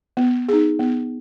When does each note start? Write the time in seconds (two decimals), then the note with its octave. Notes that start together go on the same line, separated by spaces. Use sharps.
0.17 B3
0.49 D#4 G#4
0.79 B3